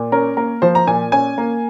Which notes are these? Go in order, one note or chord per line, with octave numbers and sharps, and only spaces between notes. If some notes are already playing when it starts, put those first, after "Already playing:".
Already playing: A#2
C#4 A#4
A#3 A#4
F3 C5
A#5
A#2 G#5
C#4 G#5
A#3